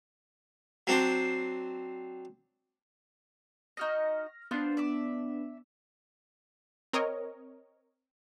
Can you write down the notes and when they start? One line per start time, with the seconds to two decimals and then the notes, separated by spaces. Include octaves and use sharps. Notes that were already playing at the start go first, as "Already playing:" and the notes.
0.87 F#3 C4 D4 C5
3.77 D#4 F#4 D#5 F6 A#6
4.51 B3 D4 F4 C5 G6
4.77 D5 E5 D6
6.93 C4 A#4 C#5 D#5